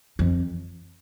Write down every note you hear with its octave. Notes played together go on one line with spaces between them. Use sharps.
F2